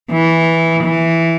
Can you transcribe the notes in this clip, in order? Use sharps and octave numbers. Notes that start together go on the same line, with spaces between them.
E3
E3